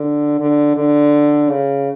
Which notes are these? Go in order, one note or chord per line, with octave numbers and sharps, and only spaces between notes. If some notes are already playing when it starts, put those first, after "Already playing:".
Already playing: D3
D3
D3
C#3